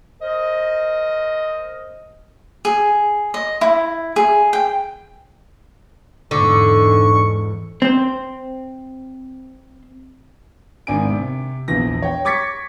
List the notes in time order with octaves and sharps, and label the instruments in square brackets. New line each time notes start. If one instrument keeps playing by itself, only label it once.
[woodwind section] A#4 C5 D#5
[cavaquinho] G#4
D#5
E4
G#4
G5
[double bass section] E2 G#2 [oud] D3 [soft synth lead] C#6
[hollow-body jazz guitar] C4 C5
[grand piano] G#1 D4 G#5 D7
C3
A#1 E2 A#6
C#5 G5
C#6 D6 G#6 A6 B6 C#7